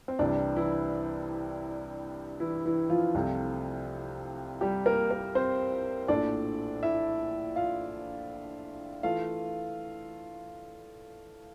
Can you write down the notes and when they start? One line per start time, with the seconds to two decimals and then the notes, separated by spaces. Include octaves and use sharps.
0.08 C4
0.19 C2 C3 E3 G3 D4
0.57 E3 E4
2.40 E3 E4
2.66 E3 E4
2.90 F3 F4
3.15 C2 C3 F3 A3
4.61 G3 G4
4.86 A#3 A#4
5.10 A#3 A#4
5.35 C4 C5
6.08 A#1 A2 F3 A3 D4 D5
6.83 E4 E5
7.56 F4 F5
9.03 E3 A3 F4 F5